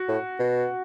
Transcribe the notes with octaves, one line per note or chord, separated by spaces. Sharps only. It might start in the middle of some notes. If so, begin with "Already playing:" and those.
Already playing: F#4
A2
B2